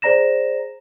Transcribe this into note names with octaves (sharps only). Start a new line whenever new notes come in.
G#4 C5 D5 A#5 A#6 E7